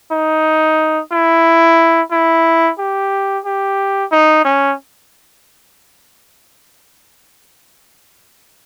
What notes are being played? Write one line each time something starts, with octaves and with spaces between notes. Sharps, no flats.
D#4
E4
E4
G4
G4
D#4
C#4